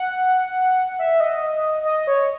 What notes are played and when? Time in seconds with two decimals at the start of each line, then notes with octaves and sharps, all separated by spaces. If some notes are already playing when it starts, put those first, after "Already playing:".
Already playing: F#5
0.99 E5
1.20 D#5
1.85 D#5
2.07 C#5